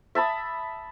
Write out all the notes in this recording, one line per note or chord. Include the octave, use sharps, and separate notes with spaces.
E5 A5 B5 D#6